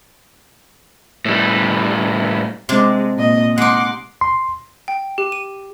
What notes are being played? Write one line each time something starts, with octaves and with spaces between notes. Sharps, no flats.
A2 G3
C3 G#3 C4 D4
A#2 D#5
G#3 D#4 F#5 C6 D6
C6
G5
G4
D#7